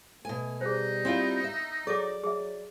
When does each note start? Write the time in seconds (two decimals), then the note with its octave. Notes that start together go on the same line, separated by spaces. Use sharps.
0.25 B2 A3 G#5
0.61 G3 D#4 G#4 C5
1.05 C4 E4 F4
1.44 E5
1.87 F#3 G#4 A4 D5 D6
2.23 F#3 G#4 E5